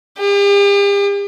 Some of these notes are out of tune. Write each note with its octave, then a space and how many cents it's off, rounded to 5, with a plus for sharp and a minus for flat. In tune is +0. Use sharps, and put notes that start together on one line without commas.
G4 +45